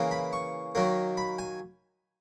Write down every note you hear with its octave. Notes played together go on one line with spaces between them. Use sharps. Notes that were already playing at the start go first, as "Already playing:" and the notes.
Already playing: C#3 E3 A#3
B5
C#6
D#3 F#3 A#3
B5
G#5